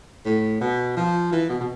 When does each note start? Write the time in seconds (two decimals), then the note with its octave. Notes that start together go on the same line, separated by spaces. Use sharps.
0.25 A2
0.61 B2
0.96 F3
1.32 E3
1.49 B2
1.60 B2